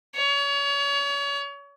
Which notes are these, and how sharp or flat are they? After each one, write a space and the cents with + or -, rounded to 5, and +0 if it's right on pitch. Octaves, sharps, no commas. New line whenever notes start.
C#5 +35